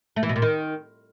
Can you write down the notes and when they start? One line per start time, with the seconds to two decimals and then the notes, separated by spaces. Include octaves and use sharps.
0.16 A3
0.23 E3
0.29 B2
0.36 A#2
0.42 D#3